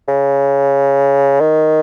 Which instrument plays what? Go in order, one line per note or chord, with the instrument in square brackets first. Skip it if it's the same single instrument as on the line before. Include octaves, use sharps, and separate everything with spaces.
[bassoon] C#3
D#3